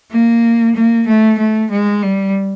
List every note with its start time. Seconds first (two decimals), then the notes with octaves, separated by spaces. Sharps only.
0.12 A#3
0.75 A#3
1.07 A3
1.38 A3
1.71 G#3
2.02 G3